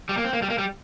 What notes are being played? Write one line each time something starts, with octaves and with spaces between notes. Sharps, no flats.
G3
A#3
C4
A#3
G3
A#3
G3